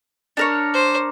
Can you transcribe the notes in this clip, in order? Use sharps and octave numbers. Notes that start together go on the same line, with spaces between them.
D4 A#4 C#5
C5